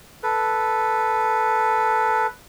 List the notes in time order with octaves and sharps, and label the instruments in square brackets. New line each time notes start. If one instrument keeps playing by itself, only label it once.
[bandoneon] A4 B4